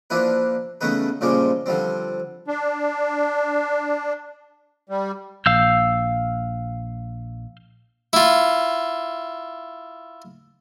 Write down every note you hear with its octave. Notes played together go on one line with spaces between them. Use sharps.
F3 A#3 D4 E4 B4
C#3 A3 B3 D#4 B4
A#2 C#3 F3 G3 G#3 D6
D3 F3 G3 C4
D4
G3
A#1 F5 E6 G6
E4 F4